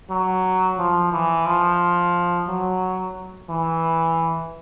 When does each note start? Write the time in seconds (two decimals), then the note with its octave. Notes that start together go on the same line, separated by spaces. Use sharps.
0.10 F#3
0.78 F3
1.12 E3
1.46 F3
2.47 F#3
3.50 E3